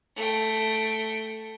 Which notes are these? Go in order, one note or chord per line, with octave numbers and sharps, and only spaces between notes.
A3 G5